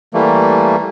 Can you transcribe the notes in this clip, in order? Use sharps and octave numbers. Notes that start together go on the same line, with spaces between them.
E3 G3 A3 A#3